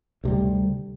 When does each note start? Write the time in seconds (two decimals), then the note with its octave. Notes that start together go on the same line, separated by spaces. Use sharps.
0.24 D2 C3 G3